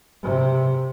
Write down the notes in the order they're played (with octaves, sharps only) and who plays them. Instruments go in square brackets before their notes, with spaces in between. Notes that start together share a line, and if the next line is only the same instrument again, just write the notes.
[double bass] C3